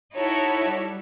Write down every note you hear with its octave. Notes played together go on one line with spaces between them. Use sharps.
D#4 E4 F#4 A4 C#5
G3